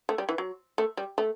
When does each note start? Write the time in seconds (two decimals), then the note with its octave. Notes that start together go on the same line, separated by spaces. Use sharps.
0.09 A3
0.18 G3
0.29 E3
0.38 F#3
0.78 A3
0.97 G3
1.18 A3